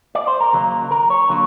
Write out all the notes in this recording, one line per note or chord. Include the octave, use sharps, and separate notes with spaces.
D5
C5
A#4
D#2 C#3 F#3 A#3
A#4
C#5
D3 F#3 A#3